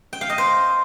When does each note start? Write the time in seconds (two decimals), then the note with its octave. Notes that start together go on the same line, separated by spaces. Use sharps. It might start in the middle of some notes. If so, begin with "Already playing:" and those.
0.13 G5
0.21 F5
0.30 D#5
0.38 C5